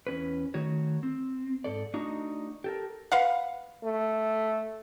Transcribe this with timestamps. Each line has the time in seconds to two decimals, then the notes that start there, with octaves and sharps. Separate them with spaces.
0.07 E2 C#4 B4
0.54 D#3 A3 F#4 C#5
1.03 C4
1.64 G#2 A4 D5
1.94 A3 D4 D#4 F#4 D#5 A#5
2.64 G4 A4 A#4
3.12 B4 F5 F#5
3.84 A3